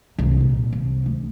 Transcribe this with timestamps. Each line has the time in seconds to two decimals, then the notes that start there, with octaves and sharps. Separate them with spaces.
0.18 C2
0.41 A#2
0.73 C2
1.06 D2